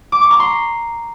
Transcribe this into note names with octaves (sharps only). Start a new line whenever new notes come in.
D6
C#6
A#5
C6